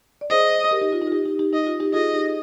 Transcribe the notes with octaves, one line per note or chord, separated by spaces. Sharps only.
D5
G#4 C5 D#5
G4 A#4
D#4 G4
F4
D#4
F4
D#4 G4
D#4 G4
D#4 G4
D#4 D#5
F4
D#4 G4
F4 G#4 D#5
F4
D#4 G4
F4 G#4